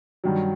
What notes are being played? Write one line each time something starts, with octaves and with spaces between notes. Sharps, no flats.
G2 D#3 F#3